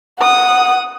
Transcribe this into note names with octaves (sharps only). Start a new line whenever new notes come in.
F#5 D#6